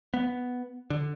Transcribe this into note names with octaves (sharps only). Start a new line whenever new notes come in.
B3
D3